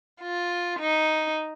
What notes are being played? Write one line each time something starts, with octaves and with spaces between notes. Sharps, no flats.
F4
D#4